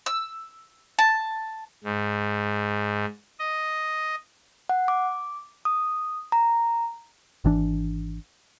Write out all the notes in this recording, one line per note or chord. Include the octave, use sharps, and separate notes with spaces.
E6
A5
G#2
D#5
F#5
D6
D#6
A#5
G#1 E3 D4